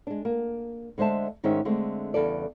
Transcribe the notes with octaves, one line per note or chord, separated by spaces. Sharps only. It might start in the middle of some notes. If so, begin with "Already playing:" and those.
G#3 D4
A#3
D3 G#3 C5 E5 A5
G#2 D#3 C#4 G#4 C5 E5
D3 G#3 A3 C4
E2 C#3 G3 A4 D5